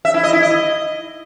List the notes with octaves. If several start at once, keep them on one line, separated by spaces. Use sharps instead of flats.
E5
E4
D#5
E4
D#5